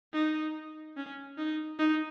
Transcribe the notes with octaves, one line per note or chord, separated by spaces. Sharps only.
D#4
C#4
D#4
D#4